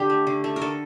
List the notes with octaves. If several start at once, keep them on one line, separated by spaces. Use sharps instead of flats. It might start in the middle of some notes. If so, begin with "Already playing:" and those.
Already playing: D3 G4
A3
D3
A3
A#4
D3 A4